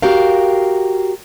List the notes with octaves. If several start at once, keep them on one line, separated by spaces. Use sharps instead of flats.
F#4 G4 A#4 F5